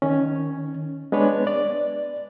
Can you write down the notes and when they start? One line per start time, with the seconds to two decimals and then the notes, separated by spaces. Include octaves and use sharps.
0.02 D#3 C#4
1.12 G#3 B3 D4 B4 C#5
1.47 D5